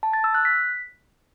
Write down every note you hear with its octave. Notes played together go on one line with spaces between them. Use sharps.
A5
A6
E6
F#6
B6